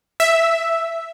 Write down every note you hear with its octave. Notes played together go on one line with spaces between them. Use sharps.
E5